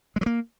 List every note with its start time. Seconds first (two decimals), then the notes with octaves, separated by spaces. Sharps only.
0.16 G#3
0.21 F#3
0.26 A#3